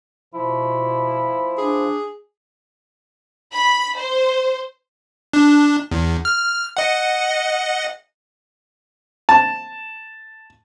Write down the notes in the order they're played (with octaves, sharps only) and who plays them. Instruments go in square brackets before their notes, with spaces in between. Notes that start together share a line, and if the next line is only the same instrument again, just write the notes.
[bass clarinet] B2 [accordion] F3 [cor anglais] E4
[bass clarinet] D4 [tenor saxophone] G#4
[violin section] B5
C5
[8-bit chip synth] D4
E2
F6
D#5 F#5
[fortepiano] A5